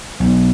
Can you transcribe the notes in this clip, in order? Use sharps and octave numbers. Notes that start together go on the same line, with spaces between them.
B1